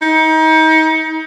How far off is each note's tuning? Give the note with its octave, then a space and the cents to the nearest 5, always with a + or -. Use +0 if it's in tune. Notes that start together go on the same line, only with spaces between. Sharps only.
D#4 +30